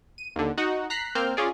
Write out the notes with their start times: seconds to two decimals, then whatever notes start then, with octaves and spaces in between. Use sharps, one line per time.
0.18 D#7
0.36 D#2 D3
0.58 D#4 F#4 F#5
0.90 A#5 F#6 B6 C7
1.15 A#3 C4 F6 G6
1.37 C#4 F4 G#4 D5